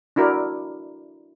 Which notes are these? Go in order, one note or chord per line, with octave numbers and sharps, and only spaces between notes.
D4 E4 F#4 A#4 D5